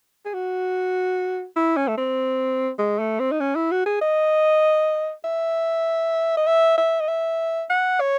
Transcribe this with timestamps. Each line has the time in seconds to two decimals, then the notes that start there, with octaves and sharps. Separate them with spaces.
0.25 G#4
0.34 F#4
1.56 E4
1.77 C#4
1.88 A3
1.97 C4
2.79 G#3
2.99 A3
3.20 C4
3.32 D#4
3.40 C#4
3.55 E4
3.71 F#4
3.86 G#4
4.01 D#5
5.24 E5
6.37 D#5
6.47 E5
6.77 E5
7.00 D#5
7.08 E5
7.70 F#5
8.00 C#5